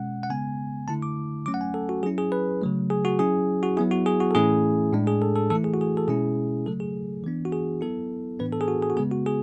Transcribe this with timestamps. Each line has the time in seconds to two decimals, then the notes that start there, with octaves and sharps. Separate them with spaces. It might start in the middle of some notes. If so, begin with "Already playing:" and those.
Already playing: B2 G#3 C#4 F#5
0.23 F#5
0.30 C#3 G#3 B3 G#5
0.88 D3 A3 E4 A5
1.02 D6
1.46 F#3 A3 C#4 D6
1.54 F#5
1.61 G#5
1.74 A4
1.89 F#4
2.03 F#3 C#4 E4 G#4
2.18 G#4
2.32 B4
2.62 C#3 F#3 A3
2.90 G#4
3.05 F#4
3.19 F#3 C#4 E4 G#4
3.63 F#4
3.77 F#3 B3 E4 G#4
3.91 F#4
4.06 G#4
4.20 F#4
4.31 A4
4.35 A2 E3 A3 C#4 E4 G#4
4.92 A2 G#3 D4
5.07 G#4
5.22 A4
5.36 A4
5.50 E3 A3 E4 A4
5.64 G#4
5.74 F#4
5.81 G#4
5.97 A4
6.08 B2 G#3 C#4 E4 G#4
6.66 C#3 F#3 A3 A4
6.80 G#4
7.24 E3 B3 D4
7.45 F#4
7.52 G#4
7.81 F#3 B3 E4 A4
8.40 A2 E3 B3 D4 B4
8.53 A4
8.61 G#4
8.68 F#4
8.82 G#4
8.90 F#4
8.97 C#3 G#3 B3 G#4
9.11 F#4
9.26 G#4